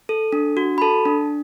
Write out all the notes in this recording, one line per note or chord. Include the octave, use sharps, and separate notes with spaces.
A4
D4
F#4
B5
A4 A5
D4